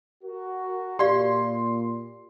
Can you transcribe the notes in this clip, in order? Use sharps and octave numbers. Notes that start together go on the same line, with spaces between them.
F#4 A#4
A#2 G4 D5 F5 C6